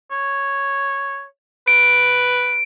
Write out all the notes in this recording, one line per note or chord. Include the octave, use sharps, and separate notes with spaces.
C#5
B4 D7